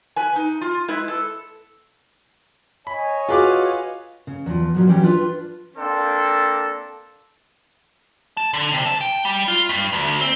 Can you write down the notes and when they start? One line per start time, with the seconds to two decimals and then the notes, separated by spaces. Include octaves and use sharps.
0.16 B4 G#5
0.36 D#4
0.61 F4
0.88 G#3 E4 B4
1.08 A4
2.87 C#5 D#5 G#5 B5
3.29 F4 F#4 G#4 B4 F5 D6
4.27 C#3
4.46 E2 F3
4.74 A#2 F3 F#3
4.87 E3 F#3 G3 C#4 G4
5.03 D4 F4 B4
5.77 A#3 C4 D4 A4
8.37 A5
8.53 D3
8.74 C3
8.86 A5
9.01 G5
9.25 G3
9.48 F4
9.69 G2
9.93 D2
10.21 C4